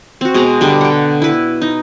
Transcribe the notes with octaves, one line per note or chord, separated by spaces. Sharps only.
C4 F#4
B2 G#3 G#4 A#5
D3 G3 D4
F#5 G5
E4 B4
D#4